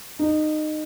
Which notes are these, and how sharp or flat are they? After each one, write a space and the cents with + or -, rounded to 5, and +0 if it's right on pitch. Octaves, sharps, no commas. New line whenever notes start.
D#4 -20